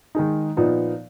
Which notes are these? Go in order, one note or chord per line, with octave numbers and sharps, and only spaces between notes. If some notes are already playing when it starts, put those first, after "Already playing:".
D#3 G#3 D#4
A#2 F3 B3 D#4